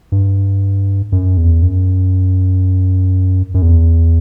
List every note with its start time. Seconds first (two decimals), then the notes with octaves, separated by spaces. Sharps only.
0.12 G2
1.12 F#2
1.37 E2
1.62 F#2
3.54 F#2
3.62 E2